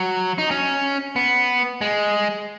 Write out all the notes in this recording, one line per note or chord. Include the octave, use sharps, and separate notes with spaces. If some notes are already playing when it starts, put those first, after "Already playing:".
Already playing: F#3
D#4
C#4
B3
G#3